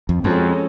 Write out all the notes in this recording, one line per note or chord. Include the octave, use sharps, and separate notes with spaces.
F2
F2 F3 G#3 C#4 F#4 A4